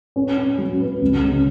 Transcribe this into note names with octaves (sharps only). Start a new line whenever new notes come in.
C#4
C#4
F#3
B4
C#2
C#3